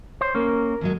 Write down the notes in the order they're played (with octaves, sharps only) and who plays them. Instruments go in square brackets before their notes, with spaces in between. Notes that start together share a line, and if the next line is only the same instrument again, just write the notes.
[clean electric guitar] C5 [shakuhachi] C#5
[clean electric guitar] A#3 C#4 [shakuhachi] A#4
[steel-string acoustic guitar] D#2 F#3 G#3